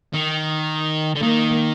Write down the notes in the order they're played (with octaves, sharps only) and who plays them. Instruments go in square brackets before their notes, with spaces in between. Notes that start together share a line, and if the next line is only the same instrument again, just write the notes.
[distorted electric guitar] D#3
D3
[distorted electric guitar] D#3 [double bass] A#3